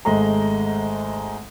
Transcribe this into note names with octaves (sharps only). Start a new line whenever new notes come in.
G#1 G#3 A3 A#5